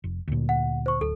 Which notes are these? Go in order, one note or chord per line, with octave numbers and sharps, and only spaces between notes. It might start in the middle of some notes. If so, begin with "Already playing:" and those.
F1
D2 A#2
F#5
C5 C#6
D1 A4